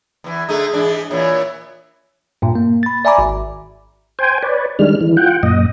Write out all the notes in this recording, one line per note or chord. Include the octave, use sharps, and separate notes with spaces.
E2 E3
D3 A3 D#4 G#4
G#2 E3 D4
A#2 E3 C#5
G2 A#2
A#3
B5 A6
D5 E5 G#5 A#5 B5 D6
G#1
C5 G5 G#5
B4 C#5 D5
D#3 G3 G#3 D4 F6
E3
F4 F#5 G5
F#2 A#2 D#5